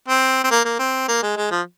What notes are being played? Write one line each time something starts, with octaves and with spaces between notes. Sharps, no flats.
C4
C4
A#3
A#3
C4
A#3
G#3
G#3
F3